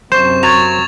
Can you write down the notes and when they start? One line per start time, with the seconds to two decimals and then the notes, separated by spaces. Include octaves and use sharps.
0.12 F#2 C3 C5 C#6 E7
0.43 F#3 G#6 A6 F7